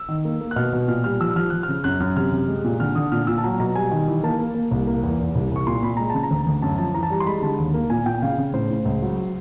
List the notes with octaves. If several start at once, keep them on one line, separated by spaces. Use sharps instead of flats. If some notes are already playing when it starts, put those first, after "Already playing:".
Already playing: E6
D#3
A#3
A#3
F#6
B2 F6
B2
A#2 F6
G3 F6
F3 E6
F3 F6
F3 F#6
F6
C#3
F#2 F#6
F#2 F6
C3 F6
C3
G#3
A#2
D3 F6
D3 D#6
A#2 F6
A#2 E6
A5
F#3 A#5
B2 A#5
G3 G#5
D#3
E3
A#3 A5
A#3
A#3
C2
A#3
E2
E2
C2
C2 C#6
A#2 C6
A#2 B5
G#3 A#5
C#3 A5
A#5
D2
D2
F#2 A5
F3 A5
E3 A#5
A5
G3 A#5
C6
G#3 B5
D3 A5
D#2
A#3
A#2 G#5
A#2 G5
C#3 F5
C#3
A2 C5
A2
C#2
F#3